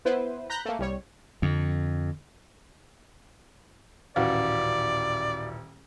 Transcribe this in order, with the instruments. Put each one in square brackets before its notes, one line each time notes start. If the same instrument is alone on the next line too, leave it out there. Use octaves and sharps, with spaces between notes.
[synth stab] B3 E4 B4 C5
A#5 B5 F#6 G6 A#6
A3 A#3
C2 G3 C#5
[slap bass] F2 [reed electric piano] D3
[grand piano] D#1 A1 E3 [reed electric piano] F#4 F5 [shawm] D5